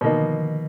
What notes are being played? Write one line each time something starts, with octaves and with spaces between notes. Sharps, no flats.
B2 D3 A#3 D#4
D#3
F3
D#3